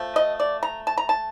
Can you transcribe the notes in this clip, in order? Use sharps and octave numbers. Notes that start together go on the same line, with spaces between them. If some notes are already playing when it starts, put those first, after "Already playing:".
Already playing: F3 A3
D#5
D5
A#5
A5
A#5
A5